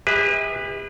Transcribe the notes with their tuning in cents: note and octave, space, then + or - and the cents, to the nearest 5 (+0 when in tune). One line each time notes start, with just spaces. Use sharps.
G#4 -45 B4 +0 E5 -40